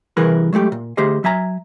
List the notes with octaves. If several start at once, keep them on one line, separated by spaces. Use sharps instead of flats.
C2 E3 G#4 A#4 B4
F#3 G#3 A3 G4
A#2
D2 A3 G4 G#4 C5 D#5
F#3 E5 G#5 A#5